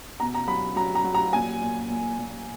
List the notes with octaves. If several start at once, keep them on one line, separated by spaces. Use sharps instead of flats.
B2 A#5
A#5
F#3 B5
F#3 A#5
A#5
F#3
A#5
A#2 G#5
A#2
A#2
A#2